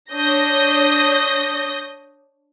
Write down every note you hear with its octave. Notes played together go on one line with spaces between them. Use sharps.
D4 C#5 D#6 G6 A#6